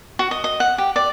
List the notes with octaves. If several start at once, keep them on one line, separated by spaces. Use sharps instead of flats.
F#4
D#5
D#5
F#5
G4
D5